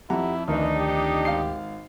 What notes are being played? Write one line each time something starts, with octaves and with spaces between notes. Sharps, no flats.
F2 E4 G4 F#5 A#5
D2 D#3 E3 D4 D#4
G4
G#1 F5 C7